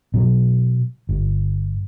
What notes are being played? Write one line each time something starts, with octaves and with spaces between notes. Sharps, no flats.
B2 F#3
G1